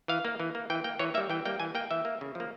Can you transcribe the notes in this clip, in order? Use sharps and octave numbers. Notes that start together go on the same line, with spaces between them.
E3 F5
A#3
E3
A#3
E3 G5
A#3 G5
E3 C#5
G3 A#3 E5
E3 G5
G3 A#3 G5
E3 G#5
A#3 G5
E3 E5
A#3
C#3
F3 A#3